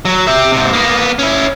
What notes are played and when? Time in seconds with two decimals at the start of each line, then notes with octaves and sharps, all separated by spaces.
0.05 F#3
0.27 G4 E5
0.52 G#2 C3
0.73 A#3 B3
1.19 C#4 E4